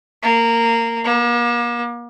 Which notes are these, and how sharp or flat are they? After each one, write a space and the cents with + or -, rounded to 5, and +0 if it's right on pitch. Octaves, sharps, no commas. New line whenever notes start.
A#3 -15
A#3 +40